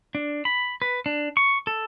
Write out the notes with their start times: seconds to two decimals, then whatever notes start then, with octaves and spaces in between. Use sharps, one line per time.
0.15 D4
0.45 B5
0.82 B4
1.06 D4
1.37 C#6
1.67 A4